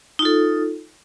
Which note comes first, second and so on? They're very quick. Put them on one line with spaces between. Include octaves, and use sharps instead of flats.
D#4 F4 A4